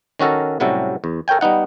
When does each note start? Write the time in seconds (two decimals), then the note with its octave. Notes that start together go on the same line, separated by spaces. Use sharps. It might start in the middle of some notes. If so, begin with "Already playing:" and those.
0.19 D#3 C#4 F#4 A4 A#4
0.60 A2 C3 F#3 G3 C#4 A4
1.04 E2
1.28 A4 A#4 C#5 G5 G#5
1.41 G3 B3 D#4 F#5